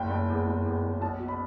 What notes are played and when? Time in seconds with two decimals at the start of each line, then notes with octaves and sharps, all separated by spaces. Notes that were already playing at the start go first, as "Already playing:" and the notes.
Already playing: F#1 G5
0.10 F#1
0.30 E2
0.46 F#1
0.66 E2
0.83 F#1
1.01 B1 A5
1.19 B2
1.28 B5